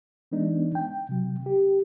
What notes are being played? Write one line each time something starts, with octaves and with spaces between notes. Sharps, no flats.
E3 G#3 B3 D4 D#4
G5
C3 F#3
G4